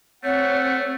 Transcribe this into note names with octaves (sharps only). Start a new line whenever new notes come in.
A3 C4 C#5 F#5